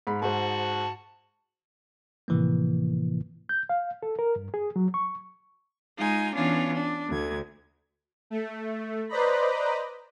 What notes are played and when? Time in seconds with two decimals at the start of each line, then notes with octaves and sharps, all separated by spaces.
0.07 G#2 B5
0.22 G#2 F#4 C5 A5
2.28 A2 C3 E3 F3 A#3
3.49 G6
3.69 F5
4.03 A4
4.19 A#4
4.36 G2
4.54 G#4
4.76 F#3
4.94 C#6
5.97 G#3 D#4 F4 G#5
6.34 E3 B3 C#4 D4 F4
6.73 D4
7.09 D2 G#6
8.30 A3
9.09 B4 C5 D5 D#5 A#5 B5